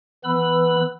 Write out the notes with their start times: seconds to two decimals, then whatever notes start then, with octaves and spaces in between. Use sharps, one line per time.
0.24 E3 B3 B4 B5 E6